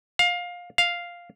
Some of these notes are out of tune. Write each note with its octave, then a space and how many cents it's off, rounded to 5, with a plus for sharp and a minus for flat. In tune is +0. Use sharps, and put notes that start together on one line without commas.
F5 +20
F5 +0